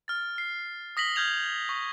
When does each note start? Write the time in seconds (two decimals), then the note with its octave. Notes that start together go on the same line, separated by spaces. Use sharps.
0.08 F6 A6
0.38 C7
0.97 D#6 A#6 B6 F#7 G7
1.16 F6 G6 G#6 F7
1.69 C#6